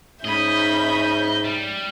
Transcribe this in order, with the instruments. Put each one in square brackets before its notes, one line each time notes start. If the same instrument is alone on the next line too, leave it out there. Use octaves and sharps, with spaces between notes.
[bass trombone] G#2 [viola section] C#4 D#4 B5 [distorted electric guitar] D#5 [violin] E5 G6
[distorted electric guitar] G3